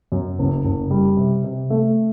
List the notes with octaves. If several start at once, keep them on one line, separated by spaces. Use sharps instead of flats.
F#2
F#1
F#1
G3
C3
C3
A3